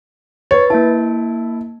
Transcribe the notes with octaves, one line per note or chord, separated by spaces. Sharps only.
B4 C#5 A6
A#3 E4 A5